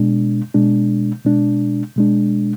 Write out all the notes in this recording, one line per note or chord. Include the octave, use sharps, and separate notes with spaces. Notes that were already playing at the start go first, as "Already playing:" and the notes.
Already playing: B2 G#3 D4
B2 G#3 D4
B2 G#3 D4
B2 G#3 D4